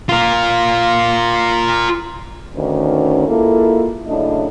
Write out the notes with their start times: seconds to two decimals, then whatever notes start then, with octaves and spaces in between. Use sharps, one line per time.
0.09 F4 A#4
2.55 D2 D#3 C#4
3.27 G#3 A#3 E4 F4 A4
4.07 F#2 C#3 A3 D4 E4 D#5